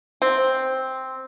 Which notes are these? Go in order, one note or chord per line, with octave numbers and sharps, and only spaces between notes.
C4